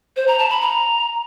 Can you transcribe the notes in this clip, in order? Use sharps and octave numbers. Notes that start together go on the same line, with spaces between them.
C5
A#5
A5
B5
A#5